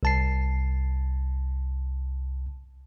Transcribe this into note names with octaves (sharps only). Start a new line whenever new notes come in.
C2 A5 C7